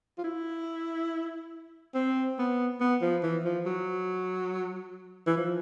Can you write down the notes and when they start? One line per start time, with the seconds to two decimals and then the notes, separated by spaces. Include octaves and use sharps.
0.18 F4
0.24 E4
1.95 C4
2.38 B3
2.80 B3
3.01 F3
3.23 E3
3.45 F3
3.66 F#3
5.27 E3
5.37 F3